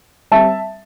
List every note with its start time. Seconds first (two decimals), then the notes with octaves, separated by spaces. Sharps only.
0.31 G3 C4 E5 A5